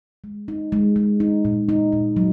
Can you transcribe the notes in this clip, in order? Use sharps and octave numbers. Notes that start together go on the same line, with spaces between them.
G#3
D#4
G#3
G#3
D#4
A#2
D#4
A#2
F#3